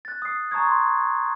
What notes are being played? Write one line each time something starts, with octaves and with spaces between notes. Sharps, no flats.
F#6 A6
D#6 C7
A5 A#5 C#6 D#6 G#6
C6